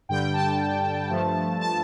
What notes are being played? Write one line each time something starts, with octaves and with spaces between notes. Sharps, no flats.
G2 D3 G3 G5
A5
G2 F3 A3
A5